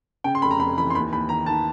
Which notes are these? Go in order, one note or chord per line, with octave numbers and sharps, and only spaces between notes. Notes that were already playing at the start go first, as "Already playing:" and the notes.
C#3 G5
C6
F1 B5
A#5
F2 B5
E3 B5
C6
D#2 B5
D#2 B5
D#3 A#5
D#3 A5